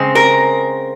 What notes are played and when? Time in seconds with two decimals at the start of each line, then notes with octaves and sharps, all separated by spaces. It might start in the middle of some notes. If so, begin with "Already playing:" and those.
Already playing: C#3 G#3 C4
0.15 A#4